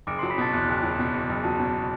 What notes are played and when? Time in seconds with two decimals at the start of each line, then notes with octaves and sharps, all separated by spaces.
0.07 F#1 D6 D7
0.19 F#3 C6 C7
0.30 B5 B6
0.38 B2 A5 A6
0.53 E2 F#6
0.69 F#1
0.83 F#3
0.99 B2
1.14 E2
1.29 F#1
1.44 F#3 A5
1.60 B2